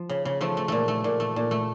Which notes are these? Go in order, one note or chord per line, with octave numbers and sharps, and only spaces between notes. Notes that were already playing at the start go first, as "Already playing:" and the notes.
Already playing: F3
C#3
C#3
F3 A3
A3
A#2 A3
A3
A#2
A3
A#2
A3